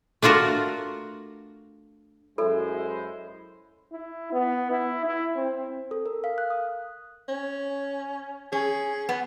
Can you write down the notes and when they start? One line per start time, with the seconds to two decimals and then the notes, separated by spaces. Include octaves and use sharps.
0.22 A3 D4 F4 F#4 A#4
2.38 F#2 G#3 E4 A4 C5
3.92 E4
4.32 B3
4.70 E4
5.05 E4
5.36 C4
5.91 A4
6.06 A#4
6.24 F5
6.38 F#6
6.50 D#6
7.29 C#4
8.53 C#4 G#4
9.09 B3